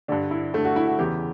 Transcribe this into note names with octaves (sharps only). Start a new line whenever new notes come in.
G2 D3 D4
E4
G2 D3 A3
F#4
E4
F#4
E2 C#3 E3 G4